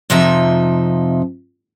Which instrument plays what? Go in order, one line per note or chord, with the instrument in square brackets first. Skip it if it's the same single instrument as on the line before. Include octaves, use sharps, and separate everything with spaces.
[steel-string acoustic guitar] F2 C3 F3 D#4 E5